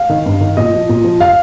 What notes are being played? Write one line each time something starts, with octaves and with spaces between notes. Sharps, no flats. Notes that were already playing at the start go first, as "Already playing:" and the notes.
Already playing: F5
D#3
G2
D#3
A#2 D#5
F3
A#2
F3
F5